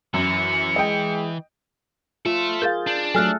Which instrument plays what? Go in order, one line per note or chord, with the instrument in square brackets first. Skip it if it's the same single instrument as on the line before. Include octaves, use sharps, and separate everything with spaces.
[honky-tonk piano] F#2 [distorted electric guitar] E3 [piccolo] C#7
[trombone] G#3 [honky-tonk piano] D#5 G5
[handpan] F4 [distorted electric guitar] A4 E5
[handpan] G#4 [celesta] A#4 F5 [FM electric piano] G6 A6
[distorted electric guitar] D4
[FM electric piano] F#3 [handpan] A3 A4 [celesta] G#5 F6 F#6